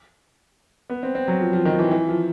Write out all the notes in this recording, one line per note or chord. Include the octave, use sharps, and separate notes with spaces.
B3
C4
C4
F#3
F3
F3
D#3
F3
E3
E3
F3